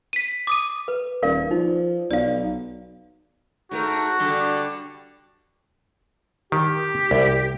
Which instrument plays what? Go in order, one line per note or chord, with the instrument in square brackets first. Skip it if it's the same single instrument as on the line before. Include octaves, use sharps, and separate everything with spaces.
[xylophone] B6 D#7
D6 D#6 D#7
[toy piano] B4
[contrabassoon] D#1 [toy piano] A#4 D5 F5
[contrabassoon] F3 [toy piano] D#4
[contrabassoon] B1 [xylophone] D5 F5
[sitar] G#2 A3 A#4 [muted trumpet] F#4
[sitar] D3 G3 A4
[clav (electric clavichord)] D#3 [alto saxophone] G4
[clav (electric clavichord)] C2